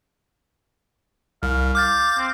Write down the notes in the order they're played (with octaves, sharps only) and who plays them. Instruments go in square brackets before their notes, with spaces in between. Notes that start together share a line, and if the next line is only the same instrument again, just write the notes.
[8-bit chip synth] C2 [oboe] F5
[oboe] F5 [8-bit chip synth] D6 G6 A6
[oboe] C4